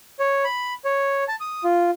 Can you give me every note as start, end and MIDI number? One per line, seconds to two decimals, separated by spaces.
0.19 0.44 73
0.44 0.74 83
0.85 1.24 73
1.28 1.36 81
1.40 1.64 87
1.64 1.91 65